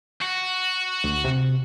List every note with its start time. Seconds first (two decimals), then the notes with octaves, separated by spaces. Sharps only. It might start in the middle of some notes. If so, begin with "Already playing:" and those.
0.22 F#4
1.04 D2
1.24 C3